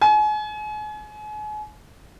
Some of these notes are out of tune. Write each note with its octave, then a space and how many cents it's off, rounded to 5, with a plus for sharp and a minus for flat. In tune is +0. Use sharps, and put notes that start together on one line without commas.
G#5 +35